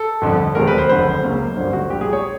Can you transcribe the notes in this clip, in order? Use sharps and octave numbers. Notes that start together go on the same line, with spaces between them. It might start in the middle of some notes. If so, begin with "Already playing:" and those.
Already playing: A4
G1 F2 D3
E1 D#2 D#3 G#3 C4 A#4
B4
C5
F#1 F2 D3 C5
C#2 C#3 F#3 A#3 C#4
A1 G2 D3 C5
F#4
A#1 A#2 G3 G4
G#4
C#5